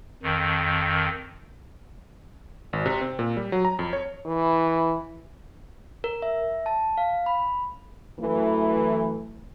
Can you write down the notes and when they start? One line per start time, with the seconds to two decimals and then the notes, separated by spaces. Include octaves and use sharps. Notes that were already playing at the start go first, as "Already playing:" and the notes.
0.23 F2 D#3
2.73 G#1
2.86 C3
3.01 C4
3.19 A#2
3.37 G3
3.52 F#3
3.65 A#5
3.79 F2
3.93 C#5
4.26 E3
6.04 A#4
6.22 E5
6.66 A5
6.97 F5
7.26 B5
8.20 F#2 E3 A3